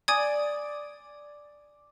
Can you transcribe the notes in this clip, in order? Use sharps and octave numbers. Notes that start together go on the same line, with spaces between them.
D5 G#5 D#6 G#6